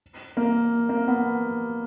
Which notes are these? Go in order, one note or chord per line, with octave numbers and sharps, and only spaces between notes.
A#3
A#3
B3